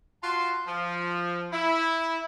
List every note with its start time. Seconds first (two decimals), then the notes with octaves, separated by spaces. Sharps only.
0.24 F4 F#4 A5 C6
0.67 F3
1.53 E4